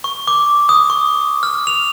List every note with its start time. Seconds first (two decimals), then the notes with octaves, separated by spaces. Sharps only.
0.04 C#6
0.27 D6
0.69 D#6
0.90 C#6
1.43 F6
1.67 F7